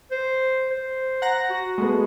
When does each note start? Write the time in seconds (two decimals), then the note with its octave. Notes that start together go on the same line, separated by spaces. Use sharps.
0.11 C5
0.71 C5
1.22 F#5 A#5 A#6
1.50 F#4
1.78 G#3 A3 B3